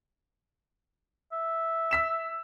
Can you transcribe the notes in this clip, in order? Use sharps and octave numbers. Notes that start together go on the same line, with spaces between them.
E5
E6 B6 E7